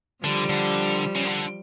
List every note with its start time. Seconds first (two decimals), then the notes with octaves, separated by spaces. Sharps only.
0.24 D3 F3 G3
0.49 D3
1.15 C#3
1.25 D3